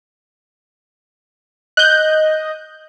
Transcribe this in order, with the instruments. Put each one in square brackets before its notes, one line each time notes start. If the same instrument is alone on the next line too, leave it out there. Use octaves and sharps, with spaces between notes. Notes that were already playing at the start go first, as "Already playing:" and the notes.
[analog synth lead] D#5 [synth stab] F#6 G6